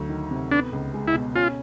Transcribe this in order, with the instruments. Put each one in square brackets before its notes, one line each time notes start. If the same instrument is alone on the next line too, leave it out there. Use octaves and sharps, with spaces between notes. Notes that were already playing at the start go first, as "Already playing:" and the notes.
Already playing: [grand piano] D2 F#3
D#3
C3
[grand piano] B3 [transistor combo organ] D4
[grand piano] C#2
G#3
[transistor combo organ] E4
[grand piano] B2
[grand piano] C#4 [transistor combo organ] F4